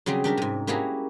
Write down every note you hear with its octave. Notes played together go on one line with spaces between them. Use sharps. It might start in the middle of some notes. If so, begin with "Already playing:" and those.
C#3 F#3 G3 C4 G#4
G3 D4 A#4 E5
G#2 C3
G3 A#3 C#4 E4 F#4 G#4